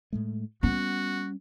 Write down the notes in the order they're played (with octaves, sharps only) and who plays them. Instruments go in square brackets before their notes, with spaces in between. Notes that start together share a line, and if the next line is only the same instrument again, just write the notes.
[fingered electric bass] A2 G#3 A3
[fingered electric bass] G3 C#4 [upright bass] B3 [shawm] F#4